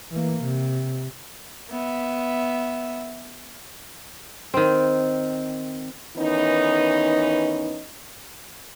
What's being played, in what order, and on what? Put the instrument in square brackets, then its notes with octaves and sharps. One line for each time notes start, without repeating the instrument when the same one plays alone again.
[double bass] E3 A#3
C3
[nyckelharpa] B3 E5
[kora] D#3 C4
[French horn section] D#3 E3 B3 C#4 D#4